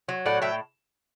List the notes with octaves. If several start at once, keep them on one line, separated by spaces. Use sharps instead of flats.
F#3
A2 D5 F#5
A2 E5 G5